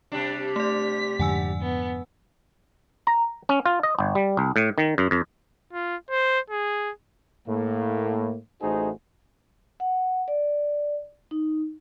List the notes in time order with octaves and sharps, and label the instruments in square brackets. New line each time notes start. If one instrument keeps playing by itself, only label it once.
[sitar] C3 G3 D4
[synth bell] A3 D5 [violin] B6
[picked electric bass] F2 G#2 D3 [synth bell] F#5 G#5 E6
[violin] B3
[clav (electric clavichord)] A#5
C#4
F4
D#5
G1
G3
C2
A2
D#3
F#2
F2
[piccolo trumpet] F4
C5
G#4
[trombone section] A2 A#3
A1 A3 D#4 F#4 G#4 C5
[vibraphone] F#5
D5
D#4